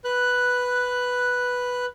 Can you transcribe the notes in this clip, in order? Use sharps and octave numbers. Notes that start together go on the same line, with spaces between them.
B4 F#6